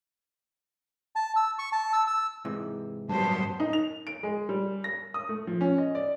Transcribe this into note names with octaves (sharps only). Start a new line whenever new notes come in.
A5
E6
C#6
A5
E6
E6
G#2 C3 E3
G2 F#3 B3 G4 C5 A5
D#4
F7
D7
G#3
G3
A#6
D#6
A3
F3
C#4
D#5
D5